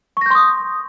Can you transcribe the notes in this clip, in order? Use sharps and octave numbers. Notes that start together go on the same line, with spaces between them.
C6 C#6 D#6 G6 A#6